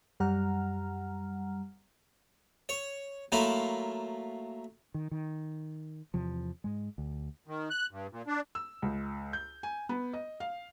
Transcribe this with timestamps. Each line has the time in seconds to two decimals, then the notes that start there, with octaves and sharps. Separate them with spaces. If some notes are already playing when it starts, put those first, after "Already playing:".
0.20 F#2 G3 F#5 A#5 F6
2.69 C#5
3.32 F#3 A3 A#3 E4 F4
4.94 D#3
5.11 D#3
6.14 E2 C3 F3
6.64 G#2 G#3
6.98 D2
7.47 D#3
7.70 F#6
7.91 G2
8.12 A#2
8.27 D4
8.55 E6
8.82 C#2
9.33 G6
9.63 G#5
9.89 B3
10.13 D#5
10.40 F5